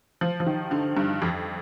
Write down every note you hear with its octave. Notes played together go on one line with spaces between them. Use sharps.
F3
F3
D#3
D3
G2
F2